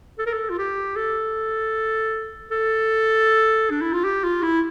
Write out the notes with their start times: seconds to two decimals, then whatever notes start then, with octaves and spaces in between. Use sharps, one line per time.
0.19 A4
0.26 A#4
0.33 A4
0.50 F4
0.59 G4
0.96 A4
2.51 A4
3.71 D4
3.81 E4
3.93 F4
4.04 G4
4.24 F4
4.43 E4